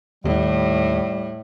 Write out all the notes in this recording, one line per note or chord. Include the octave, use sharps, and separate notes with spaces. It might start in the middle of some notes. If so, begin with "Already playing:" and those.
D#2 A2 G3